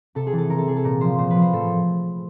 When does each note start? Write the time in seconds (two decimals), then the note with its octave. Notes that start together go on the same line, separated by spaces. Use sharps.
0.15 C3 A4
0.27 G#4
0.33 E3
0.38 A4
0.50 C3 A#4
0.58 A4
0.67 E3 G#4
0.76 A4
0.84 A#2 A#4
1.01 F3 C5
1.18 A#2 C5
1.31 F3 B4
1.42 C5
1.52 A2 A4